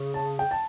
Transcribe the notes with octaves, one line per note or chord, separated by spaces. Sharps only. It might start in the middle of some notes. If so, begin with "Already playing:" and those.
Already playing: C#3
A5
G5
A5